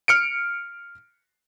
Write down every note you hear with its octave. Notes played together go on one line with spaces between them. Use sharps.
F6 C#7 D7